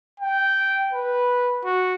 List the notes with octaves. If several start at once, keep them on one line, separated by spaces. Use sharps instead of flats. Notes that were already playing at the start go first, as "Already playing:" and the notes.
G5
B4
F#4